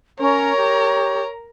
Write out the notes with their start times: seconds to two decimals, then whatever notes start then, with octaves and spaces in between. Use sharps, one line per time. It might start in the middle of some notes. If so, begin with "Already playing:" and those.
0.20 C#4 A#4 C#5 A#5
0.57 G4